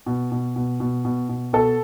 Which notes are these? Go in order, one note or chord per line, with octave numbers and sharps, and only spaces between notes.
B2
B2
B2
B2
B2
B2
B2 A4